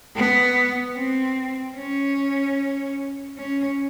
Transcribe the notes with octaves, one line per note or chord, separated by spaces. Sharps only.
B3
C4
C#4
C#4